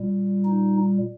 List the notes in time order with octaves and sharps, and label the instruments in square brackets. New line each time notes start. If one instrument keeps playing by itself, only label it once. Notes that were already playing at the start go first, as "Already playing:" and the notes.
Already playing: [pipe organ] A#2 G3
D#4